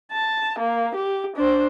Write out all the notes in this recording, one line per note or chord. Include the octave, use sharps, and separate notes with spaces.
A5
A#3
G4
D4 C5